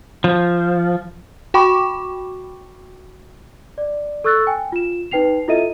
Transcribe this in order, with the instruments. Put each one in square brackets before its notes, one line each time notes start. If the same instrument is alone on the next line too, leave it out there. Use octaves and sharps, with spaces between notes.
[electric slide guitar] F3
[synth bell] F#4 G5 B5 C#6 D6
[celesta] D5
A4 C#6 E6 F#6 A6
G5 G#5
F4 E7
D#4 B4 G5 C7 F7
E4 F4 A4 D#5 E5 D#7